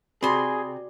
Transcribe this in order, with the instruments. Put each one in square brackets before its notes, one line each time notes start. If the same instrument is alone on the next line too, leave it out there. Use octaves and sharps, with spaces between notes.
[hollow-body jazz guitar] C3 C4 [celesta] F#4 D5 D6 [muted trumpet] G#4 [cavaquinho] B5 C6